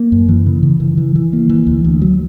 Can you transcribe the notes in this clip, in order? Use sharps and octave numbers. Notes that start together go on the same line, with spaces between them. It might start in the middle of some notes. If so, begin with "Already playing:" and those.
Already playing: A#3
F#2
E3
C#3
C#3
E3
E3
E3
A#3
E3
D2
D2
F#3